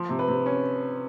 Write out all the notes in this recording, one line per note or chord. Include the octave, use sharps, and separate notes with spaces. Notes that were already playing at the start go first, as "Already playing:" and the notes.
Already playing: F3
C3
B4
C3
C#4